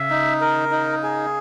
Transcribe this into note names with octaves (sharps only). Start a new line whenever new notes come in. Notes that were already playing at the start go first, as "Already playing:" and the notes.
Already playing: C#3 E5
D#4
A#4
D#4
G#4